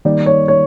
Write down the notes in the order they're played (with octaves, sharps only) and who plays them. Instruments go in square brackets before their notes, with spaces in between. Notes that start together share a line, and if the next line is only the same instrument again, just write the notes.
[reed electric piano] D#3 G3 A#3 D#4 [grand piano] D5
[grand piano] C#5
C#5